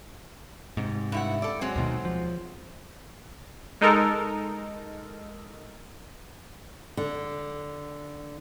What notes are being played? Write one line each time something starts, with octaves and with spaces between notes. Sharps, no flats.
G#2 C3
G2 E4 F#5
A4 D5
F#3 G#3 C4
D2 B2 D#3
F3
G#3 D#4 A4 A#4
D3